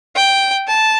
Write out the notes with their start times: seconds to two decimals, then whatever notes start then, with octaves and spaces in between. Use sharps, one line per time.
0.16 G5
0.68 A5